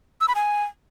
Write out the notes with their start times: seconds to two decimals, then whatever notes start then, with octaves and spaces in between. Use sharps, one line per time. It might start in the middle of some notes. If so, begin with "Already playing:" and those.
0.21 E6
0.28 B5
0.35 G#5